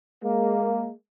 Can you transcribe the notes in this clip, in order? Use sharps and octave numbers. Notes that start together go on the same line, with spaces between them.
G#3 A#3